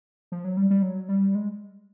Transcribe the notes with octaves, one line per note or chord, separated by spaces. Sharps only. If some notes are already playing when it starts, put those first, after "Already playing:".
F3
F#3
G3
G3
F#3
G3
G#3